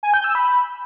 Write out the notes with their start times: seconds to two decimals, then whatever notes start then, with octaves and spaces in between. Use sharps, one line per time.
0.03 G#5
0.14 G6
0.24 E6
0.35 B5